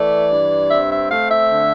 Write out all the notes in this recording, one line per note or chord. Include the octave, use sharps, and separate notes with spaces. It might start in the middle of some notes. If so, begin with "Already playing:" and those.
Already playing: E3 A3 D5
G2
C4 E5
E5
A3 F5
E5
D3